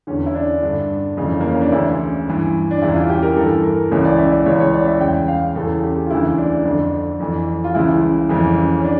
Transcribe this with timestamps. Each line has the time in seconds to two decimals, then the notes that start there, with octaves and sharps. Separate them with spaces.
0.07 E2 D3 C#4
0.26 E4
0.35 D4
0.63 G2 D3
1.17 F2 C#3 E3
1.41 A#3
1.51 C#4
1.61 D4
1.72 D2 C#3 E3 E4
2.27 G2 E3
2.71 D4
2.82 E2 C#3 E3 E4
2.95 F4
3.09 G4
3.23 A#4
3.36 G2 E3 A4
3.64 A#4
3.91 C#2 C#3 E3 C#5
4.05 D5
4.19 E5
4.32 D5
4.46 C#2 C#3 E3 C#5
4.60 C#5
4.74 D5
4.87 E5
5.01 E2 C#3 E3 G5
5.28 F5
5.55 E2 C#3 E3 A4
5.83 G4
6.06 F4
6.10 D2 C#3 E3 E4
6.38 D4
6.65 F2 D3
7.20 F2 E3
7.64 F4
7.75 C#2 C#3 E3 E4
8.29 F2 C#3 E3
8.80 C#4
8.84 D4